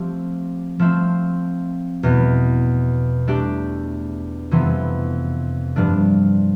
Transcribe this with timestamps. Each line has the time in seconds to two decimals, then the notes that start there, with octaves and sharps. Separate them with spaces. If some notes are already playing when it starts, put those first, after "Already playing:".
Already playing: F3 A3 C4 G4
0.79 F3 A3 C4
2.03 E2 B2 B3
3.27 A3 D4 G4
4.51 F2 C3 E3 B3
5.76 G2 F3 A3 D4